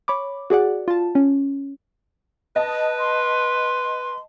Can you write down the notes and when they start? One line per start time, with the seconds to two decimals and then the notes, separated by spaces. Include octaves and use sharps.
0.08 C#5 B5 D6
0.50 F#4 G#4 D5 F#5
0.88 F4 A5
1.15 C#4
2.56 B4 D#5 A5
2.99 C6